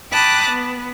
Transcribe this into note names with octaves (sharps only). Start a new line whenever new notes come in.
G5 A5 B5 D6 D#6 F#6
B3